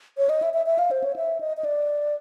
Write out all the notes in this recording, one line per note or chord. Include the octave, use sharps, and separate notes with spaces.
C#5
D#5
E5
E5
E5
F5
C5
C#5
E5
D#5
D#5
D5